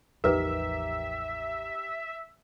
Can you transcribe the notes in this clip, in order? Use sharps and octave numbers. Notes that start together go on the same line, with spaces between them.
A1 E2 F3 D#4 G4 A#4 B4 E5